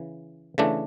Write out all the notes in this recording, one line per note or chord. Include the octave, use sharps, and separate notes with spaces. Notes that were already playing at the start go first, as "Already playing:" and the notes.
Already playing: C#3 E3
C#3 E3 A3 D4